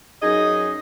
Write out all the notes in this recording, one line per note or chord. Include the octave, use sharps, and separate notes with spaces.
F#2 D#4 G#4 D#5